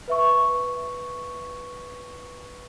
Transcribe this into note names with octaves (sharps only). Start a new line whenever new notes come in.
B4 E5 C#6